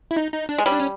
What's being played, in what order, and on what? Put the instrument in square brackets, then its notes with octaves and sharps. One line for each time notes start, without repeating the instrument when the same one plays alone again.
[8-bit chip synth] E4
D#4
D#4
D4
[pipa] G#3
[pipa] G3 [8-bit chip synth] C#4
[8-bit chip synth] D4
C#4